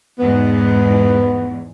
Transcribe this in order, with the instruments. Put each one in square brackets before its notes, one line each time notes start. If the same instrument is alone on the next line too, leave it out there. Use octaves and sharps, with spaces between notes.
[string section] E2 G#2 [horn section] B3